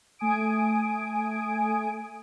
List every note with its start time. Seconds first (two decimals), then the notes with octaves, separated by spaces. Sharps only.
0.19 A3 G#5 D#6 D7